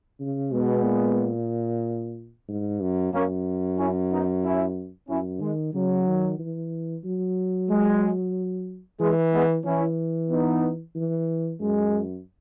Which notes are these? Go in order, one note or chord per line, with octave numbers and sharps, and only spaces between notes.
C#3
B2 G#3 B3
A#2
G#2
F#2
F#2 A#3 C#4
C#4 E4
B3 D#4
C#4 E4
F#2 C#4 E4
D#3 G#3
C#3 F#3
D#3
E3
F#3
G#3
E3 G#3
G#3 B3
E3 C#4 E4
B3 D#4
E3
F#2 G#3